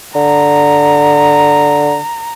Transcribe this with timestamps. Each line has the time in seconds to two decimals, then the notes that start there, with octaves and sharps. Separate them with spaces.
0.16 D3 A#5